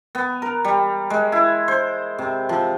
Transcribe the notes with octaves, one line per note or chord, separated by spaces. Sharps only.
B3
A#4
G3
G#3
E4
C5
C3
F3